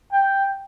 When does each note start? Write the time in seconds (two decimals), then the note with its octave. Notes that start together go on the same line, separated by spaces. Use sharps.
0.13 G5